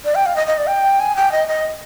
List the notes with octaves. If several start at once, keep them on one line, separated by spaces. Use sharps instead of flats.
D5
G5
F5
D#5
D#5
D5
G5
G#5
G5
D#5
D#5